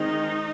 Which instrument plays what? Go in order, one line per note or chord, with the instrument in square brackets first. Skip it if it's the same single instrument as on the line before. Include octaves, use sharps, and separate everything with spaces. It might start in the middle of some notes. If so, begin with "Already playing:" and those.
Already playing: [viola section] D#3 G#3 C4 D#4